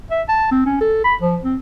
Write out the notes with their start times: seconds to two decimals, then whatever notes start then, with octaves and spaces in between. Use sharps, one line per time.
0.11 E5
0.28 A5
0.51 C4
0.66 C#4
0.81 A4
1.04 B5
1.21 F3
1.44 C4